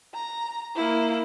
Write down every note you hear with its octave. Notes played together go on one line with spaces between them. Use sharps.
A#5
A#3 E4